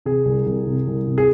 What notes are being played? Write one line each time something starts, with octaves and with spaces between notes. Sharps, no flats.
C3 G#4
C2
C2
C3
C2
C3
G#4